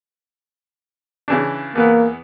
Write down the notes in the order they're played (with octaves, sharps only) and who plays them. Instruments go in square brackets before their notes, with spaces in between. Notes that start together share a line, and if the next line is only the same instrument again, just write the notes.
[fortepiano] C#3 E3 D4
[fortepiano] E2 E3 B3 [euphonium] A#3